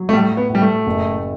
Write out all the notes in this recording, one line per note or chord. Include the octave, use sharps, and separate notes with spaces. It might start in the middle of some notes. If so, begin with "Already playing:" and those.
Already playing: F#3
A3
A2 G3
B3
A2
G3
A3
F#1